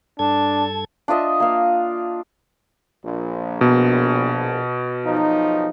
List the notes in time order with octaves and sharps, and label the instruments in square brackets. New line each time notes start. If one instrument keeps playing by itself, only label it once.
[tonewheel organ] G2 A4 G#6 [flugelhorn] D4 [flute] A5
[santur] D4 F4 D#5 E5
A#3 F5
[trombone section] A#1
[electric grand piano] B2
[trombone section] B1 F3 D#4